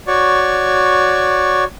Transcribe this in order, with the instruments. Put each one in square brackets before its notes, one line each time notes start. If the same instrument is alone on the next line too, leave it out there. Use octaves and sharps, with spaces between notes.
[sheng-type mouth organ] F#4 C#5 D5 C#6